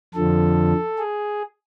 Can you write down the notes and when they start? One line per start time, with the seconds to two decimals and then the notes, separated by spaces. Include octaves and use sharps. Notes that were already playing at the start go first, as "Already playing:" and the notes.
0.14 F2 D3 F3 A4
0.98 G#4